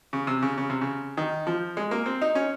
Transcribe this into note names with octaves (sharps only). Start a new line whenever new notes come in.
C#3
C3
C#3
C#3
C3
C#3
D#3
F3
G#3
A#3
C4
D#4
C#4